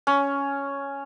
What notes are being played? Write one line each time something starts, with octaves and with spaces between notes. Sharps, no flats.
C#4